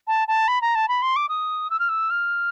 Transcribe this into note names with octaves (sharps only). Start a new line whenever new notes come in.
A5
A5
B5
A#5
A5
B5
C6
D6
D#6
E6
F6
E6
F6